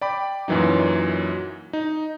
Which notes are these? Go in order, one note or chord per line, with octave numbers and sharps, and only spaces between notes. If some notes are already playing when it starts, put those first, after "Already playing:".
D5 G5 B5 D6
F#2 A#2 E3 F#3 D#4
D#4